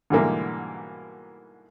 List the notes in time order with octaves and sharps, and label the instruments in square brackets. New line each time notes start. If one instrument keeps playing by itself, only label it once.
[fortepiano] G#2 B2 D3 E3 G3 A#3